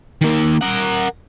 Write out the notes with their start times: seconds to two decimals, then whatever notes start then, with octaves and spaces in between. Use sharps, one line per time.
0.21 D#3 A#3
0.61 A#4 F#5